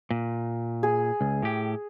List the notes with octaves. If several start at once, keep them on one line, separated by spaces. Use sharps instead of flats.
A#2
G#4
C#2
A2 G4